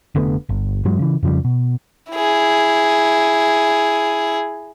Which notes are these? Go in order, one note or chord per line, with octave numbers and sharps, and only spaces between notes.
F1 D3 A3 B3
G1
G2 E3 F#3 G#3
C#3 E3
F2 C#3 F3 G3
B2
E4 G#4